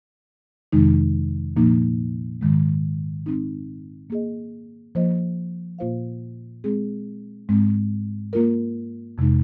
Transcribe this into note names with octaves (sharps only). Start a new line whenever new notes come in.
F2 C3 D#3 G#3 D#4
A#2 F3 A#3 D#4
G#2 D#3 G#3
G#3 C4 D#4
A#3 G#4 D#5
F3 A#3 F4 C5 D#5
A#2 A#3 F4 C5 F5
G#3 C4 G#4
G#2 G#3 C4
A#3 F4 A#4
F2 C3 G#3 D#4